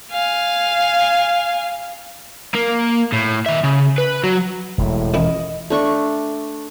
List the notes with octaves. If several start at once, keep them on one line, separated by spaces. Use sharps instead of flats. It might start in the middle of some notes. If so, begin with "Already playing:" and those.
F5 G#5
A#3
A2
D#3 E5
C#3
B4
F#3 F#4
E1 A2 G#3
A1 D#3 E4 D#5
A3 D4 C#6